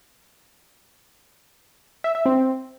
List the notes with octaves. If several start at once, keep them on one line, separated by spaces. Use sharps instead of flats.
E5
E5
C4